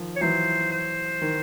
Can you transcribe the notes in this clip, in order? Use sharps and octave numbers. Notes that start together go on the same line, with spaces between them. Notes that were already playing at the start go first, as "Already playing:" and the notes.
Already playing: D#3 F3
C#5
E3 F#3 C5
C5
D#3